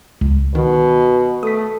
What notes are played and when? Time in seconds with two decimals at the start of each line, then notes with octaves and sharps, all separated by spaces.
0.21 C#2
0.55 B2 D#3
1.43 A3 D#6 B6